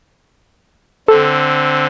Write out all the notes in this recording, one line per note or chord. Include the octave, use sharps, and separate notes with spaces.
D3 C4 A4